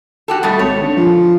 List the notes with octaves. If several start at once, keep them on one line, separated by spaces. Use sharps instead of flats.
F#4 G4 A4
B2 G3 A3
G#1 C#5
D3
F3